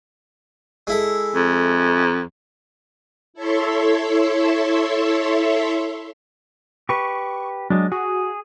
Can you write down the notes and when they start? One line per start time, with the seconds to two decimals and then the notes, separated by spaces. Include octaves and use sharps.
0.87 G#3 E4 A4
1.35 F2
3.34 E4 A4 C#5 E5 C6
6.89 G4 B4 C#6
7.70 F#3 G#3 D4
7.92 F#4 G#4